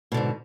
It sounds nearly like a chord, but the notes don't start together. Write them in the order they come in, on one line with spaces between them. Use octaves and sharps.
B2 D3 G#2